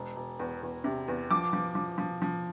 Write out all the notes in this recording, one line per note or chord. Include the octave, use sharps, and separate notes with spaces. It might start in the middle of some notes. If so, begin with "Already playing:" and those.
Already playing: E1
E1
E2
E2
C3
E2
F3 D6
F3
F3
F3
F3